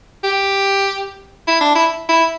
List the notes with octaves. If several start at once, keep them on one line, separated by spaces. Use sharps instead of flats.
G4
E4
D4
E4
E4